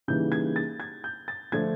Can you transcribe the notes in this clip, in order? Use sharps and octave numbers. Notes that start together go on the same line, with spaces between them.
C#3 E3 G3 A#3 D#4 G6
G#6
A6
G#6
G6
A6
D3 F3 A3 D4 F4 G#6